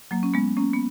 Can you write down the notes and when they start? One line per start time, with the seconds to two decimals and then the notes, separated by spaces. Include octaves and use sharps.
0.11 F#3 A#3
0.23 C#4
0.34 G#3 B3
0.56 A#3 C#4
0.73 B3